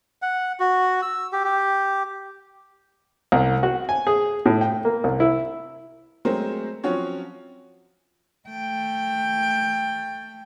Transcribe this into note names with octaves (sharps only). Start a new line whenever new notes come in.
F#5
F#4
E6
G4
G4
C2
F#4
G#5
G#4
A2
G5
A#3
C2
E4
F#3 G#3 A3 C4 A#4 C5
F3 F#3 C4 C#4 F#4 C#5
A3 G5